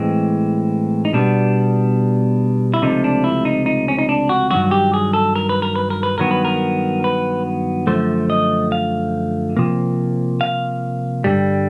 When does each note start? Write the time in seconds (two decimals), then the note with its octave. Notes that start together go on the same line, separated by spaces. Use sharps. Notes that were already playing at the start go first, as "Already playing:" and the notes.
Already playing: A2 E3 G#3 C4
1.05 D#4
1.13 B2 G3 B3 D4
2.74 E4
2.82 C#2 C3 F3 A3 D#4
3.04 D4
3.24 E4
3.45 D#4
3.66 D#4
3.88 C#4
3.99 D#4
4.09 D4
4.29 F#4
4.51 G2 D#3 F#3 F#4
4.71 G4
4.94 G#4
5.13 A4
5.36 A#4
5.49 B4
5.62 A#4
5.76 B4
5.90 A#4
6.03 B4
6.18 G2 D#3 F#3 B3 A#4
6.31 B4
6.45 A#4
7.04 B4
7.87 F#2 D3 F3 A3 C5
8.30 D#5
8.72 F5
9.57 C3 F3 A#3
10.41 F5
11.24 G2 D3 G3